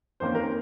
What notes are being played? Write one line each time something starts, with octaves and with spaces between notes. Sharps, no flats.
F2 D#3 A#3 C#4 C5
A#4